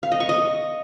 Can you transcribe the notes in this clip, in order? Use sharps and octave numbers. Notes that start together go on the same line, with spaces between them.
F5
D#5
C#6
D#5